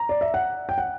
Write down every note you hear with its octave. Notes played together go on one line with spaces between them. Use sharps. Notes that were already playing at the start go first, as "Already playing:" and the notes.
Already playing: A#5
D5
E5
F#5
G5
F#5